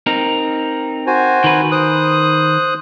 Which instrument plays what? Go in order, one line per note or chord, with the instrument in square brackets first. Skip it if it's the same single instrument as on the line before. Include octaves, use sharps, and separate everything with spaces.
[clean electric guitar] C4 D#4 A#4
[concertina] F#4 C5 G#5
[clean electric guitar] D#3 B4
[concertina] C5 D#6 F#6